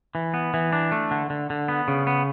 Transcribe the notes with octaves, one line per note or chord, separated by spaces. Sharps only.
E3
B3
E3
D4
A3
D3
D3
D3
B3
C#3
B3